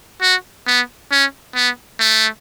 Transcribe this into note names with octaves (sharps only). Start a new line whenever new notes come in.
F#4
B3
C#4
B3
A3